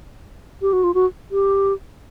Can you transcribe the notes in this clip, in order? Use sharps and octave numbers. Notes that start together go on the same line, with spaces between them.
G4
F#4
F4
F#4
G4